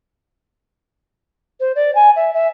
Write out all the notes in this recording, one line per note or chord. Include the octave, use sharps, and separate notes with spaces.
C5
D5
G#5
E5
E5